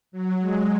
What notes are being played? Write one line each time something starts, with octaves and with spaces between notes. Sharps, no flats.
F#3
G#3